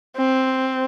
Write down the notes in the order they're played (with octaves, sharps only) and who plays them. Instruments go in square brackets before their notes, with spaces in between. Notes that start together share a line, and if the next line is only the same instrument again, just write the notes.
[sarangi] C4